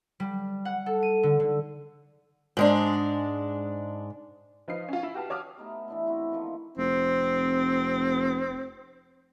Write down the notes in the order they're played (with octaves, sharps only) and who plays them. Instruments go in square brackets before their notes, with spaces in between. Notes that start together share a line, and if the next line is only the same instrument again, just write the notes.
[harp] G3
F#5
A4
D#7
D3
D3
[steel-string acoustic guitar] G#2 G#3 D4
[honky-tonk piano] F3 D#4 B4 F5 C7
C#4 F4
E4
F#4 G4 B4 F5 A5
F#4 C#5 D6 D#6 F6
[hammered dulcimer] A3 B3 D#4 G4
E3 D4 E4
C4 E4 F#4 B4
D#3 F3 A3 A#3
[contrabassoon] F1 [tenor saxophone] C4